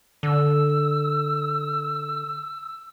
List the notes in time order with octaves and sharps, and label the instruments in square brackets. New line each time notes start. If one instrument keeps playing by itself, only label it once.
[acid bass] D3 [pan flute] E6